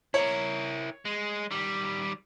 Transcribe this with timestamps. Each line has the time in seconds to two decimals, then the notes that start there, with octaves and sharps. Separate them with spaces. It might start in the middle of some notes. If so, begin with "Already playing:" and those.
0.14 E4 A#4 C#5
1.05 G#3
1.51 D#3 G3